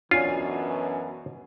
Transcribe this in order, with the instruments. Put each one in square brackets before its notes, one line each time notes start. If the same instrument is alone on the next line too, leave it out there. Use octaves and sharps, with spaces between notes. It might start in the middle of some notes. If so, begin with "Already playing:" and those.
[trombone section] F#2 B2 E3 [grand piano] D4 C#5 G#5 [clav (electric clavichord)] F4